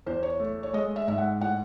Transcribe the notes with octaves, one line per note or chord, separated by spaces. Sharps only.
E2 C5
C#5
A3
C#5
G#3 D#5
E5
G#2 E5
F#5
A2 F#5